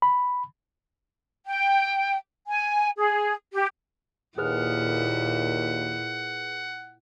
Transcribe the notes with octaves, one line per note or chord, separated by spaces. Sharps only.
B5
G5
G#5
G#4
G4
D#2 A#2 E4 G#4 B4 F#5 F6